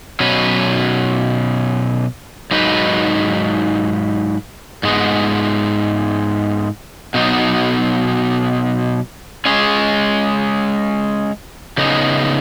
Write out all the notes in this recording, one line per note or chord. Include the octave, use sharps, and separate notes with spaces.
B2 F#3 C#4 B4
G#2 F#3 D#4 B4
G#2 G#3 B3
B2 F#3 B3 D#4
G#3 C#4 G#4 C#5
C#3 B3 D#4